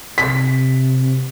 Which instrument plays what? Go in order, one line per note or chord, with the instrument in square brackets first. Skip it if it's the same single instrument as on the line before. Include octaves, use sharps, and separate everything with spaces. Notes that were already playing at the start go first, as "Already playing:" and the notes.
[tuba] C3 [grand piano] B6